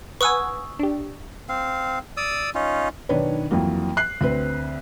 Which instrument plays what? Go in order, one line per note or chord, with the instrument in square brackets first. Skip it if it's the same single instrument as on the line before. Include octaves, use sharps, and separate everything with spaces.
[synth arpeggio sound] B4 F#5 G#5 [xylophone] C#6 D#6 E6
[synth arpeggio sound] D4 G4
[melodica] C4 F5
D5 D#6 E6
C#4 D#4 F4
[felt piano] B1 D#3 D4 B4 C#5
F2 E3 F#3 A#3
F#6 C7
D2 C4 B4